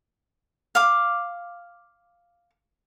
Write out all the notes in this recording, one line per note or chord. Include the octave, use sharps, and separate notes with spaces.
F5 D6